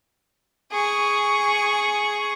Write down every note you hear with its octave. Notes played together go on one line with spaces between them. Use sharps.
G#4 C#6